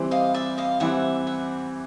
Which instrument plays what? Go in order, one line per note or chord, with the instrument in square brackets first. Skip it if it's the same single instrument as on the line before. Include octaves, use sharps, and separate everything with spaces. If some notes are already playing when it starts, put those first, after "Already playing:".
Already playing: [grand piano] E3 G3 C4
[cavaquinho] D#5 F5
D5 E5
D#5 F5
[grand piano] E3 G3 C4 [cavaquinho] E5 F#5
[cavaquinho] E5 F#5